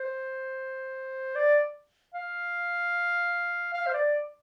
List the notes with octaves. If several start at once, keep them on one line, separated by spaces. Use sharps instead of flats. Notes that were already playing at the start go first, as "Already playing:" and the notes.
Already playing: C5
D5
F5
F5
C5
D5